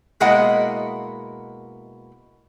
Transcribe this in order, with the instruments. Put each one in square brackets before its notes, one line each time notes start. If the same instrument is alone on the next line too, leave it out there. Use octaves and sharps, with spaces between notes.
[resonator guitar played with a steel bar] B2 G#3 A#3 E4 D#5 F#5